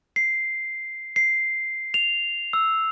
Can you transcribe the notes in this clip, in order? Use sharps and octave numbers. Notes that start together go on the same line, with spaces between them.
C7
C7
F7
E6